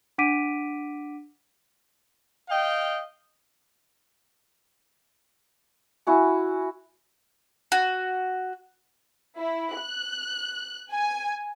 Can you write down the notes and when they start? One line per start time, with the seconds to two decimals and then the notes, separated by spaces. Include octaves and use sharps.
0.18 D4 F#5 D6 B6 D7 D#7
2.50 D#5 F5 G5
6.07 E4 F#4 G#5
7.72 F#4
9.38 E4
9.78 F#6
10.92 G#5